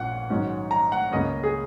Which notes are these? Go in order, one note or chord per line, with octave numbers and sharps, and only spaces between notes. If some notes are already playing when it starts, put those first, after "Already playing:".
Already playing: A#1 A#2 C#4 F#5
G#2 D#3 F#3 C#4
A#5
F#5
C#2 C#3 A#3 C#4 D#5
G#4